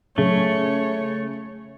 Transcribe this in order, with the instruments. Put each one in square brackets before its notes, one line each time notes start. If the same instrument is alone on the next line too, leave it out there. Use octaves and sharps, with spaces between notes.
[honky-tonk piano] C#3 [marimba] F#3 [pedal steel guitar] A3 [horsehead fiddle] C#5